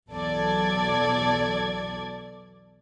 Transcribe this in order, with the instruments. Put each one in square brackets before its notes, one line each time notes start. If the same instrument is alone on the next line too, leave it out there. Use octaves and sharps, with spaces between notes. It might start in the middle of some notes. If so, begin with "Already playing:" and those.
[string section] B1 E2 F#3 A4 D5 G#6